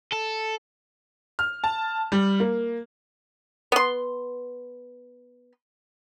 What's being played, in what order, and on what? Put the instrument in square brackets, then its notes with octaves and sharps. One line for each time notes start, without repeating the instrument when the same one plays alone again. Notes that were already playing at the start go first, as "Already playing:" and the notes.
[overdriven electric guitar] A4
[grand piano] F6
A5
G3
A#3
[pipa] B3 C6